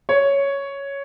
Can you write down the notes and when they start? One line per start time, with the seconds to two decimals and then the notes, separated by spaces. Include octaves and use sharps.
0.09 C#5